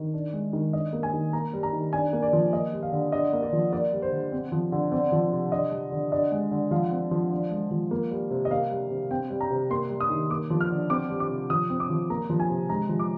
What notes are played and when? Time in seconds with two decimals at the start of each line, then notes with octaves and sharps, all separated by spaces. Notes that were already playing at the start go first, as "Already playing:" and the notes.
Already playing: D#3
0.14 D4
0.33 G#3
0.53 D#3
0.73 D4 D#5
0.93 A#3
1.03 G#5
1.13 D#3
1.33 A#3 A#5
1.53 G3
1.63 A#5
1.73 D#3
1.93 D4 G#5
2.13 A#3
2.22 D5
2.33 F3
2.53 A#3 D#5
2.73 G3
2.82 F5
2.92 D3
3.12 D4 D#5
3.33 A#3
3.43 D5
3.53 F3
3.72 A#3 D5
3.92 G3
4.02 C5
4.12 D3
4.32 C4
4.52 F3
4.72 D3
4.92 C4 D5
5.12 F3
5.32 C3
5.52 D4 D#5
5.71 G3
5.92 D3
6.12 D4 D#5
6.32 G#3
6.51 D3
6.71 F3 F5
6.92 C4
7.11 F3
7.31 D4
7.51 G#3
7.71 F3
7.91 A#3
8.11 G3
8.31 C3
8.45 D#5
8.51 A#3 F5
8.71 G3
8.91 C3
9.11 C4 G5
9.30 G3
9.41 A#5
9.50 C3
9.70 A#3 C6
9.90 G3
10.00 D#6
10.10 D#3
10.30 A#3 D6
10.50 F3
10.61 F6
10.71 D3
10.90 C4 D6
11.10 G3
11.20 D6
11.30 C3
11.50 F3 D#6
11.70 C4
11.80 D6
11.90 F3
12.10 A#3 A#5
12.30 F3
12.40 G#5
12.50 C3
12.69 G#3 A#5
12.89 F3
12.99 D6